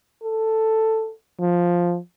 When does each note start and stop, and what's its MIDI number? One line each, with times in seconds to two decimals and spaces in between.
0.23 1.11 69
1.40 1.98 53